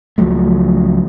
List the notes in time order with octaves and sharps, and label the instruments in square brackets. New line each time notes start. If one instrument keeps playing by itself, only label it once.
[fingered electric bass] C#2 F3 F#3 A3